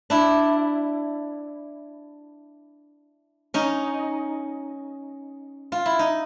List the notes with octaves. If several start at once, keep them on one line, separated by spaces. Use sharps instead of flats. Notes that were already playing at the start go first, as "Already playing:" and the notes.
D4 E4
C#4 D#4
F4
E4
D#4